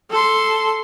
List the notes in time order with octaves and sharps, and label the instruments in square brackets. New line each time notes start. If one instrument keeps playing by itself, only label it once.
[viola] A4 C6